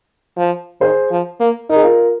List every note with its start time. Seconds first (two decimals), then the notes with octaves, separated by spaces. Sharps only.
0.37 F3
0.81 D#3 G#4 C5
1.11 F3
1.40 A#3
1.70 D#4 A#4
1.76 G#4
1.83 F4 A#4